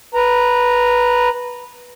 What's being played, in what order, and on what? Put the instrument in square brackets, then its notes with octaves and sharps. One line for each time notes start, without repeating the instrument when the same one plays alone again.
[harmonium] B4 A#5